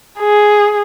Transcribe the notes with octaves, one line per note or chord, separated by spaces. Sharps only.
G#4